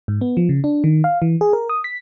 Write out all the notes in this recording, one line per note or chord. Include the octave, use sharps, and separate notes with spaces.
G#2
B3
F3
C#3
D4
D#3
F5
E3
G#4
A#4
D#6
B6